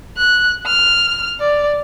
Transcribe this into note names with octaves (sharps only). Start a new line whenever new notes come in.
F#6
F6
D5